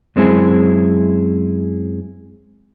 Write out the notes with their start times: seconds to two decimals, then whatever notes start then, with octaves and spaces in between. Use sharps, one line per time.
0.16 F#2 G#3 C4 E4 G#4